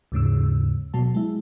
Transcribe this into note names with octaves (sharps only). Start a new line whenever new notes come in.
D#2 G#2 C#3 E6
B2 F#3 A5
G#3 E4